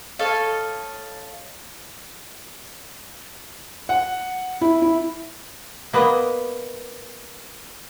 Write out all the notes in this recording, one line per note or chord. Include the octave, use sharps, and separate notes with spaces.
A4 C#5 D#5 F5
F#5
E4
E4
A#3 B3 B4 D#5